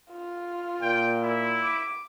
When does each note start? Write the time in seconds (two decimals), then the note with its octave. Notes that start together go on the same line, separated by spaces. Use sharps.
0.12 F4
0.82 A#2 G5
1.22 E4
1.62 D6